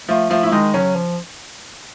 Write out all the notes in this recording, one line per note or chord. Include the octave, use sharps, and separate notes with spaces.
F3 A3 F4
F3 A3 F4
A3 E4
D#3 G#3 D#4
C#3 F#3 C#4
F3